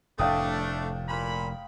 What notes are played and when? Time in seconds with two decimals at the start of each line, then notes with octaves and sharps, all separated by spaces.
0.19 F1 A2 A3 D4 F5 G5 D#6
1.09 A#2 B5